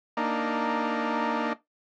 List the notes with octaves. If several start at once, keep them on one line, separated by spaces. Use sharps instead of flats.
A#3 D4 D#4